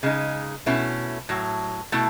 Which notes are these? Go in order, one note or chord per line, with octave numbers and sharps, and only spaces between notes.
C#3 G#3 D#4
B2 A3 C#4 E4
A2 F#3
B2 A3 E4